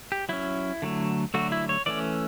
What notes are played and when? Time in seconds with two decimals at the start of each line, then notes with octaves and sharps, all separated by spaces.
0.12 G4
0.29 F#3 C#4 E4
0.82 D3 F#3 A3
1.34 D3 F#3 A3 F#4
1.52 E4
1.69 C#5
1.86 E3 A3 C#4 D5